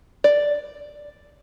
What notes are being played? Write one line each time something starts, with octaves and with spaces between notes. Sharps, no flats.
D5